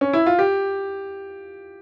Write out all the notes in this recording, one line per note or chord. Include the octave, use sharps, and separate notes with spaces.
C#4
E4
F4
G4